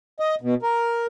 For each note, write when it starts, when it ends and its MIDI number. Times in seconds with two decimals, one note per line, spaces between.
0.20 0.35 75
0.41 0.54 47
0.62 1.06 70